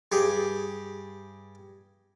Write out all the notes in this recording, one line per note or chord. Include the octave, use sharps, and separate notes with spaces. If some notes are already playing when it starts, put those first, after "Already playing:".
G2 G4 G#4